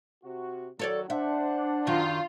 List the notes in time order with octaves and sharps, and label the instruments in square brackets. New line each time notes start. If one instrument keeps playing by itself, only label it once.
[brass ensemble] C3 F#4
[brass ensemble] A2 D#3 F#3 [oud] A4 C#5 D5
[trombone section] D4 [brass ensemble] C5 F#5 [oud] E5
[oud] F#2 D#3 F#3 [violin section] F4